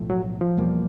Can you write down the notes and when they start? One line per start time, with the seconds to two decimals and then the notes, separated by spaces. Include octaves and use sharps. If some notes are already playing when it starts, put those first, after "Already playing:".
Already playing: B1 A2 F3 A3
0.10 F#3
0.41 F3
0.57 E2 B2 G3 A#3